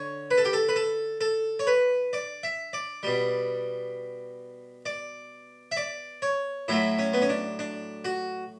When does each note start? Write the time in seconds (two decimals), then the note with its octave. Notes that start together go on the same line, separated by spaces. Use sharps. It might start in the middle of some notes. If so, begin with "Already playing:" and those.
Already playing: D3 C#5
0.31 B4
0.38 A4
0.45 G4
0.53 A4
0.69 B4
0.76 A4
1.21 A4
1.59 C#5
1.67 B4
2.13 D5
2.43 E5
2.73 D5
3.03 B2 G3
4.86 D5
5.72 E5
5.77 D5
6.22 C#5
6.68 A2 F#3 A3 E4
6.99 C#4
7.13 B3
7.22 C#4
7.29 D4
7.59 D4
8.05 F#4